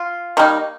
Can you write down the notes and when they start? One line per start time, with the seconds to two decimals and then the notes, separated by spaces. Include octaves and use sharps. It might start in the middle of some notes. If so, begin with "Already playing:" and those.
Already playing: F4
0.37 D#3 G3 A#3 D#4